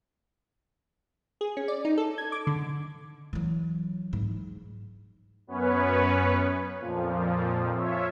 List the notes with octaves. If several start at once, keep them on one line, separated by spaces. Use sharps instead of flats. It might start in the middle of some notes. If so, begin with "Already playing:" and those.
G#4
C#4
D5
D#4
A4
G#6
D6
D3
E3 F#3
G#2
F#2 B3 C#4 B4 C#5
F2 A#2 F3
F4 C#5 E5